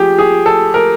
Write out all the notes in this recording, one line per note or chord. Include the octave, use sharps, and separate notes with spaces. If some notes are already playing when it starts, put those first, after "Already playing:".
Already playing: F3 G4 G#4
G#4
A4
A#4